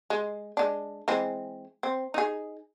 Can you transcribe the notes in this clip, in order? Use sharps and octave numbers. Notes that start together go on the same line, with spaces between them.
G#3
G#3 D4
E3 G#3 C4
C4
D#4 G#4